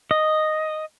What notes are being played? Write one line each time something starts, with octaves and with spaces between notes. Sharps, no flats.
D#5